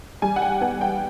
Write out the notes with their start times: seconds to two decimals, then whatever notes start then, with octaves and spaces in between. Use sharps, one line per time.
0.22 G3 G#5
0.36 F#5
0.42 G5
0.61 B3 G#5
0.81 G5